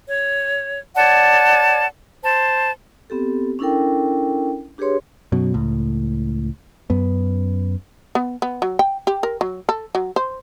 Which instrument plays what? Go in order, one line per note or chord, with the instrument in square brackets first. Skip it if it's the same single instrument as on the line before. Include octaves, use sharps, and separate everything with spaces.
[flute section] C#5
C#5 D5 F#5 A5
C5 A5
[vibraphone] B3 C4 G4 A4
C#4 D4 E4 A4 A#4 G5
D4 G4 G#4 B4 C#5 C6
[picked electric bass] F#2 B2 F#3
C#2 A2
F#2 B3
[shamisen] B3
B3
F#3
G5
G4
A#4
F#3
A4
F#3
C5